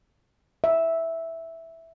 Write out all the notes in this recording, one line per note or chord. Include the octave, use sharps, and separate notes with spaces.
E5